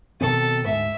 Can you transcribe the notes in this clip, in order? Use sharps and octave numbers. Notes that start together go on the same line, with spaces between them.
B2 D#3 C4 A4
D2 G#2 E5